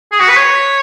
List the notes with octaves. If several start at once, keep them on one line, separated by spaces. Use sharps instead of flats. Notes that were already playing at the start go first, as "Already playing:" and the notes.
G#4
F#4
B4
C#5